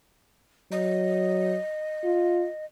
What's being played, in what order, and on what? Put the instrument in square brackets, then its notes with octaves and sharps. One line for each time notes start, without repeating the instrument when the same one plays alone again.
[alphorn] F#3 [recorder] D#5
[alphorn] F4